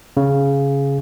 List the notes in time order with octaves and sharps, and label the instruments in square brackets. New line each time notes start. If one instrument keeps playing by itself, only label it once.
[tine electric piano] C#3